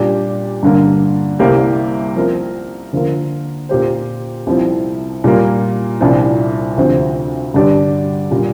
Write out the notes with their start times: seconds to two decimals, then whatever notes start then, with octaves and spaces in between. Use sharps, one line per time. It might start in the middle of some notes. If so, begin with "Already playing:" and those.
Already playing: A#2 G3 D4 G4
0.63 G2 D3 A#3
1.39 C2 C3 A#3 G4
2.16 F3 C4 A#4
2.93 D3 F3 A#3 F4 A#4
3.69 A#2 A#3 G4 C5
4.47 C2 C3 F3
5.24 A#2 G3 A#3
6.00 C2 A#2 F3 D4
6.77 D2 C3 F3 C4
7.54 G2 D3 G3 D4 G4
8.31 A#2 G3